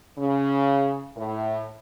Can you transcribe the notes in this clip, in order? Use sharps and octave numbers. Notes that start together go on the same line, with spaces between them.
C#3
A2